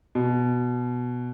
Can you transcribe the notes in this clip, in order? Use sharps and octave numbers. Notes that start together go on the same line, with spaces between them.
B2